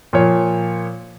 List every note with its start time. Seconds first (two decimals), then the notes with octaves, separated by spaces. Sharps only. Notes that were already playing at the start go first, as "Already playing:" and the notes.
0.13 A#2 F3 C#5